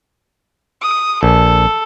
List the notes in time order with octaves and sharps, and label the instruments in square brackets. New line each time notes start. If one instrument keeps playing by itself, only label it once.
[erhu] D#6
[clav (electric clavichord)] A#1 [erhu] A4